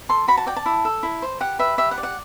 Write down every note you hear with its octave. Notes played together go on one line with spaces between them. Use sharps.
A4 C6
F#4 B5
A5
D5 G5
A5
E4
A4
E4
C5
G4 F#5
B4 E5
G4 E5
F#5
D5
F#5